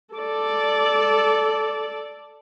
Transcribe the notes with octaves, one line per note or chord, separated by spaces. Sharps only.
A4 D5